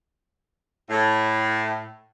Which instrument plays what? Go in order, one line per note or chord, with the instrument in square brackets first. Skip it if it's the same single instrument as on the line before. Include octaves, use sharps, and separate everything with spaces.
[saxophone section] A2